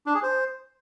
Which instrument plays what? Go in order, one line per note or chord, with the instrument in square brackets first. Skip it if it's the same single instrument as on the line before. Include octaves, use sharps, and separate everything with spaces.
[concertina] D4
G#4
C5